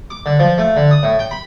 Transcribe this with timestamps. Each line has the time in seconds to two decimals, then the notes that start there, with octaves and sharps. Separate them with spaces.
0.10 D6
0.26 D3
0.39 F3
0.58 A3
0.76 D3
0.91 D#6
1.03 A2
1.19 G5
1.31 B5